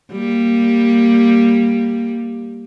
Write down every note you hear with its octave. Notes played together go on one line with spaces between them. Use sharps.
G3 A#3